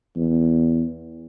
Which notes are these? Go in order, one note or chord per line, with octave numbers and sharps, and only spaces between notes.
E2